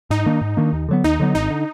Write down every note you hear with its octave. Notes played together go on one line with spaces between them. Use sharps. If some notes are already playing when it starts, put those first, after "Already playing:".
G#2 D#4
D#3 A#3 D4
G#2
D#3 A#3 D4
D#2
D3 F#3 B3
D#2 D#4
D3 F#3 B3
G#1 D#4
D3